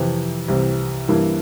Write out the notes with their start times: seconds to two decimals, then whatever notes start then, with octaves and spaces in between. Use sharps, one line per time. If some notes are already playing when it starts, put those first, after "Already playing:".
Already playing: F2 C3 E3
0.48 C2 C3 E3
1.08 G2 E3 A#3 E4